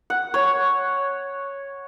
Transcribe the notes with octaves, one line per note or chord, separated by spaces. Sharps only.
F#5
C#5